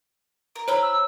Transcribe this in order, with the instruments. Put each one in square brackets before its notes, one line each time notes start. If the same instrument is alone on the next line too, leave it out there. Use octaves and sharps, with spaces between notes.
[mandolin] A#4
[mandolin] E4 A#5 B5 [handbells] C5 C#5
[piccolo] E6